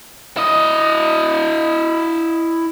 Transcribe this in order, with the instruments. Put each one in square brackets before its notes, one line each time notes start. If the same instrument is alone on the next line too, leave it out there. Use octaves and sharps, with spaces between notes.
[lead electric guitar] E4 D#5